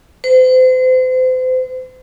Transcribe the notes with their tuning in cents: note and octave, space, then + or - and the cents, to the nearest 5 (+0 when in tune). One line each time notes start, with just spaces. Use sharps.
C5 -35